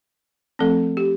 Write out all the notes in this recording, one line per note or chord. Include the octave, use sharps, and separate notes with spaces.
F3 A3 C4 A4
G4